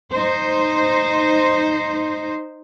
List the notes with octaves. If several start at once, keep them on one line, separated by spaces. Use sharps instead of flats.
D#4 C5